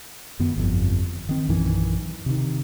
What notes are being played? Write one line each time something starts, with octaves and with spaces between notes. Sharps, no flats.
F#2 D#3 B3
G1 F2
D#3 C4
A#1 F#2 D#3 E3
C3 D#3